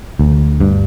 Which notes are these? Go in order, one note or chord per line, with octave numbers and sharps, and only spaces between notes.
D2
G2